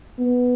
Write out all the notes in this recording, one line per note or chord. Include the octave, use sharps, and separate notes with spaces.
B3